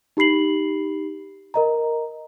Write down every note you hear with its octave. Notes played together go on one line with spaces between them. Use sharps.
D#4 G4 B5 C7 F#7
A#4 D#5 A#5